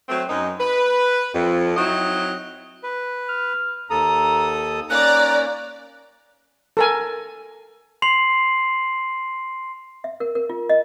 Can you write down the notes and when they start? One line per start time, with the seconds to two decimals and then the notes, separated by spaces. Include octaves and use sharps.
0.09 F#3 A3 C4
0.28 F#2 D#4
0.59 B4
1.34 F2
1.77 F#3 C4 D#4 E4 D#5
2.83 B4
3.28 F6
3.90 D#2 A4 A#5 D#6
4.90 A#3 C#4 D#4 D5 A#5 F#6
6.77 A4 A#4 G#5
8.02 C6 C7 F7 F#7
10.04 E5
10.20 A#4
10.35 A#4
10.50 F4
10.69 D#5